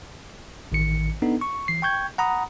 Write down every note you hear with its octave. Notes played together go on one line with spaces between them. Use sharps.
A1 D#3 C#7
B3 D4 D#4 A4
C#6
E3 C7
G5 C#6 G6 G#6
F#5 A#5 B5 D#6